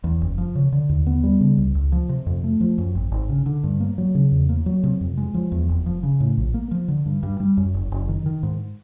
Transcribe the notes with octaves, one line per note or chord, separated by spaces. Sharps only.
E2
F#1
F3
C#3
D3
D#2
B3
G3
C#3
C#2
C#2
F3
C3
F2
A3
F3
F#2
G#1
G#1
C#3
D3
G2
A#3
F#3
C#3
E2
A#3
F#3
C3
F2
G#3
F3
E2
F1
F3
C#3
A2
A#1
A#3
F3
D3
G2
G2
G3
F#2
F#1
F#1
D#3
D#3
G#2